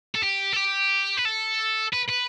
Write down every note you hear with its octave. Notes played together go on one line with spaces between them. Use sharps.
A4
G4
A4
G4
B4
A4
B4
B4